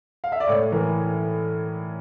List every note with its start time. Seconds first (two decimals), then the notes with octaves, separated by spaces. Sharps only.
0.24 F5
0.32 E5
0.40 D5
0.48 A2 C#5
0.72 E3 A#4